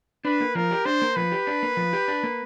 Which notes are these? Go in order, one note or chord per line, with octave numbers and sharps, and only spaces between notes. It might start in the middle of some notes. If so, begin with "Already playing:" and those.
D4 B4
A#3
F3 A#4
G4
D4 C5
A#3
F3 B4
G4
D4
A#3
F3
G4
D4
A#3